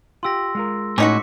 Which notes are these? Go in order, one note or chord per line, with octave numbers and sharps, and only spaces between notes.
F4 G4 C6 E6 A#6
G#3 F4 A#4
A2 C#4 D#4 F#4 D6 B6 C#7